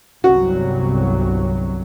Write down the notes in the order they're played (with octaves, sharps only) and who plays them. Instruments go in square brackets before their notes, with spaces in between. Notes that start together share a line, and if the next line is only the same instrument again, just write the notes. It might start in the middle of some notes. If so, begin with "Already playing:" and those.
[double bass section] G1 C2 F#3 [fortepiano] F#4